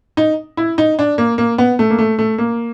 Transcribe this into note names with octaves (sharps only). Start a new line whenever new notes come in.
D#4
E4
D#4
D4
A#3
A#3
B3
A3
A#3
A3
A3
A#3